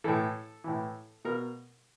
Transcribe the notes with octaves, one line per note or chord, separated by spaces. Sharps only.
A2 E3 A4
A2 E3
B2 A#4